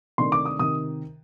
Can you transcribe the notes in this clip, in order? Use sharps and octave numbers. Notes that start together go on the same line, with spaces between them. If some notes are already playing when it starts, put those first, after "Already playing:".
C3 D#3 A3 D4 C6
D6
D#6
C3 D#3 D#6